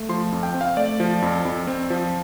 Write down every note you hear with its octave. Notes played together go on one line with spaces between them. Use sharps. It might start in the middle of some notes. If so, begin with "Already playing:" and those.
Already playing: A3
F3 C6
F2
G5
C4
F5
A3 D5
F3
F2
F2
C4
F3